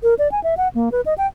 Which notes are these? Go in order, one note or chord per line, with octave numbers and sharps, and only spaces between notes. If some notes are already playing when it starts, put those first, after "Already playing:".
A#4
D5
G#5
E5
F#5
A#3
B4
D#5
G5